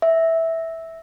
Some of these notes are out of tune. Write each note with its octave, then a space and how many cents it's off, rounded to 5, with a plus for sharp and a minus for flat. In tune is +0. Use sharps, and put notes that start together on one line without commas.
E5 -10